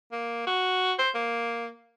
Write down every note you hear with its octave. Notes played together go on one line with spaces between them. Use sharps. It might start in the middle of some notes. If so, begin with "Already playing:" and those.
A#3
F#4
C5
A#3